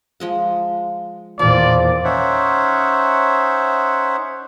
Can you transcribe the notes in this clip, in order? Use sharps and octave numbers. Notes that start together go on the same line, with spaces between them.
F3 G#3 F#5
E2 A#2 D#3 F3 D5 F5
C#4 D#4 C5 C#5 E5 F#5